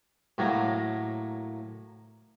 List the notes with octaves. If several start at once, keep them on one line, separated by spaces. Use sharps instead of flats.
A2 F#3 A#3